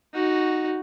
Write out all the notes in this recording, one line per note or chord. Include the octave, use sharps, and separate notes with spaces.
D#4 F#4